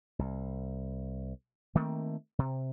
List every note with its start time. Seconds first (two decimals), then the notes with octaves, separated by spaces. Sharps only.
0.19 C2
1.75 D#3 A3 A#3 C4
2.39 C3